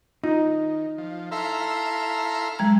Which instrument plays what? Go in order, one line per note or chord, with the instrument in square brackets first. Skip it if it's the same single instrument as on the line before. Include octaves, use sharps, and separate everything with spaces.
[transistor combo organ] D#3 [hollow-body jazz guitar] D#4 [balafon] F4
[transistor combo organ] F3
[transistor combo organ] E4 E5 F5 [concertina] A4 A#5 C6
[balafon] F#3 G#3 A#5